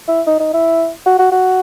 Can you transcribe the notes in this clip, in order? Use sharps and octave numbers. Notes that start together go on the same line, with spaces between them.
E4
D#4
D#4
E4
F#4
F#4
F#4